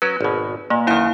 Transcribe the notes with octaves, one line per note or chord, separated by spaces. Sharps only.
F#3 C#4 B4
G#1 B2
A#2 A#3
F#2 D#3 E4 F5